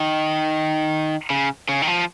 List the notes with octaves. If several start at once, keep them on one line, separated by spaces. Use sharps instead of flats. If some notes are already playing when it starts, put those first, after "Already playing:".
Already playing: D#3
C#3
C#3
D#3
F3